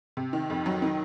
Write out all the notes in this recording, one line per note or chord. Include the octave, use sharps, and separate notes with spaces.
C3
D#3
F2
F#3
D#3